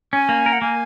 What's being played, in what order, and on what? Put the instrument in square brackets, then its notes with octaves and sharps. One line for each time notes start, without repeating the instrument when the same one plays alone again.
[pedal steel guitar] C#4 [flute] G#5
[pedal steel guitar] A#3
A#4
[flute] F#5
[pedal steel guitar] A#3 [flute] G#5